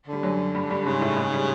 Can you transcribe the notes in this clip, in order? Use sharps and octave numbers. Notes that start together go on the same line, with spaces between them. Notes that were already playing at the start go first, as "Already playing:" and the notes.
D3 G3
F#2 F#3
G2 G3
G2 G3
G#2 C#3 G#3
A2 A3
G#2 G#3
G3